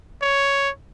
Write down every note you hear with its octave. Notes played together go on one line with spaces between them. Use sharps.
C#5